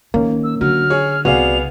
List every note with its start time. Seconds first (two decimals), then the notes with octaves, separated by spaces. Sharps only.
0.14 D#3 A#3 C#4
0.44 E6
0.61 D3 F#3 F6
0.90 G#4 C#5
1.25 C2 B3 F#4 G#4 D5 F5 F7